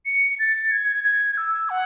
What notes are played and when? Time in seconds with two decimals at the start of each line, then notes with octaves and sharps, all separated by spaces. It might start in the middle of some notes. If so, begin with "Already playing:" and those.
0.06 C#7
0.39 A6
0.71 G#6
1.04 G#6
1.37 E6
1.70 F#5